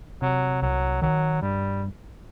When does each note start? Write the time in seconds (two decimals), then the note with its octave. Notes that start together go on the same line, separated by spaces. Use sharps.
0.22 C3 F#3
0.62 C2 F#3
1.02 D#3 F#3
1.42 G2 G3